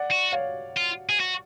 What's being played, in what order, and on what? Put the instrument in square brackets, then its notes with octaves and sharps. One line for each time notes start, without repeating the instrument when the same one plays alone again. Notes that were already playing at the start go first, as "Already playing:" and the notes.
Already playing: [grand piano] D5 F#5
[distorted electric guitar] F#4
[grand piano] C#5 F5
[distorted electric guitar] F4
G#4
F#4